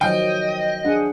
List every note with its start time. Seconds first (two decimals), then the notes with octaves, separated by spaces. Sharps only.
0.01 D#3 F3 F#3 D#5 G5
0.84 D4 G#4 F#5